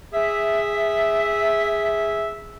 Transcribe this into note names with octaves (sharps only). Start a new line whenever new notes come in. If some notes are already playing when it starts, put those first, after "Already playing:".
G#4 E5